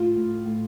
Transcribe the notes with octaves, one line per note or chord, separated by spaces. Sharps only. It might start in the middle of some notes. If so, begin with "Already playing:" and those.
Already playing: A2 F4
A2
A2